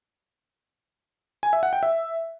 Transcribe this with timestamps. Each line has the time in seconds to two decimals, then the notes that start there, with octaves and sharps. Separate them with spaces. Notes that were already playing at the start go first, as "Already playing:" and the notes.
1.43 G#5
1.53 E5
1.63 F#5
1.73 G5
1.83 E5